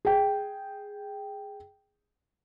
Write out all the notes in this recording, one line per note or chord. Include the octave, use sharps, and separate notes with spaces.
G#4 G5